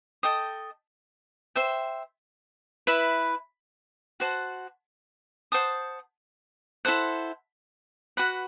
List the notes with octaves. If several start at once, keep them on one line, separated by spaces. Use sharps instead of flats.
A4 D#5 G5 D#6
C5 E5 G5
E4 B4 E5 B5
F#4 C5 F#5 A5
C5 F#5 A5 D#6
E4 A4 C5 F#5
F#4 B4 F#5 B5